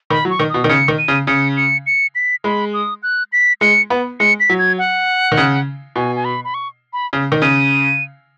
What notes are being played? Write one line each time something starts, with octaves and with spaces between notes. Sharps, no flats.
D#3 B5
F#3
C#6
D#3
B2 D#6
D#3
C#3 C#7
D#3
D#7
C#3
C#3 C#7
C#7
C#7
B6
G#3 B5
D#6
F#6
B6
G#3 C#7
B3
G#3 C#7
B6
F#3
G#6
F#5
D#3
C#3
B2 G#5
G#5
B5
B5
C#6
B5
C#3
D#3
C#3 D#7